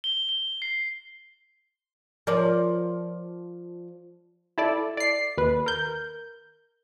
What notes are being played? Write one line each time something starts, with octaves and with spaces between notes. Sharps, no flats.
G7
G7
C7
F3 A#4 D5
E4 A4 D5
D5 C7
D#2 B4
A#4 G6